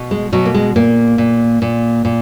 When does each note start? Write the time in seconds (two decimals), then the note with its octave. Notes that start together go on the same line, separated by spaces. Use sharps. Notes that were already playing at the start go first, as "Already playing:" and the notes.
Already playing: B2
0.11 G#3
0.32 B2 F#3
0.45 A#3
0.54 G#3
0.76 A#2 A#3
1.18 A#2
1.62 A#2
2.05 A#2